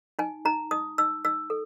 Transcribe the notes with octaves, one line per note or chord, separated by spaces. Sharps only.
D#4 G#5
D#4 A#5
D#4 D#6
D#4 E6
D#4 E6
A4